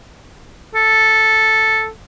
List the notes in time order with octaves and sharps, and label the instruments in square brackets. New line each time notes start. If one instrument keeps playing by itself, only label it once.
[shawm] A4